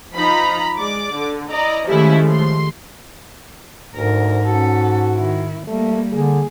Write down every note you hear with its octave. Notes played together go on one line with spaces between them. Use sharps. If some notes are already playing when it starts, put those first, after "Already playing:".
F3 D#4 F4 A#5 B5
G#3 D5 D6
D3
E4 D5 D#5 A#5
D#3 F3 G#3 A3 C#4 E4 G4
C6
D2 G#2 A#4
C#4 F#4 A4
D#3 E4
G3 A3 A#3
D3 G#4